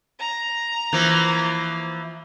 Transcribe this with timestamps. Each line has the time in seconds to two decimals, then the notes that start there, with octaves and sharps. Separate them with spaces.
0.20 A#5
0.93 E3 F3 A#3